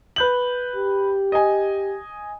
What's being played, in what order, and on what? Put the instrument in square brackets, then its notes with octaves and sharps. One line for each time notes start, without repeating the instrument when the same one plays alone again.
[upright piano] B4 G6 F#7
[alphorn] G4
[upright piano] D#5 G#5